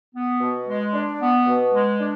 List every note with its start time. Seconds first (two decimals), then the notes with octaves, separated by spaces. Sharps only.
0.15 B3
0.40 B2
0.68 G#3
0.94 D4
1.21 B3
1.46 B2
1.73 G#3
1.99 D4